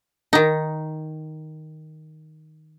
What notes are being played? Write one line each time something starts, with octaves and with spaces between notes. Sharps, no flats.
D#3 D#4